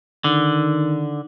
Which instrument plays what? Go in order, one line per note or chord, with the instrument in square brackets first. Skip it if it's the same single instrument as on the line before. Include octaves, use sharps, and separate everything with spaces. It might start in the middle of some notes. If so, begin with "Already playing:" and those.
[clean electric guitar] D3 [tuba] D#3